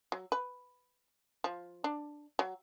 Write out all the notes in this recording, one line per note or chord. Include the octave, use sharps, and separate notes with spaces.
F#3
B4
F3
D4
F#3